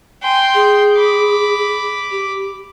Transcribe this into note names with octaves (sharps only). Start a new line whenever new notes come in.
G5 G#5 C6
G#4
B5 D6
G4